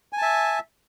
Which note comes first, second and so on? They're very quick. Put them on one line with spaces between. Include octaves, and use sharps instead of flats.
G#5 A5 E5